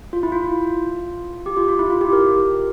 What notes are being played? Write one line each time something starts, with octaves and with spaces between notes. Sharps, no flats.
F4
E4
F4
G4
F4
F4
E4
F4
G4
A#4